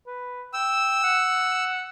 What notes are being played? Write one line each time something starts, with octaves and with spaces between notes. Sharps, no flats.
B4
G5 E6
F#5